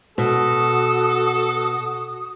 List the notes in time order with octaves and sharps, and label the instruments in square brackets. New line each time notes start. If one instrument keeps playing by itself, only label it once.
[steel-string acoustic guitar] B2 [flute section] F#4 D#6 [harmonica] A4